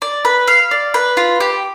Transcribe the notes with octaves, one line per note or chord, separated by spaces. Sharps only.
D5
B4
F5
D5
B4
F4
G4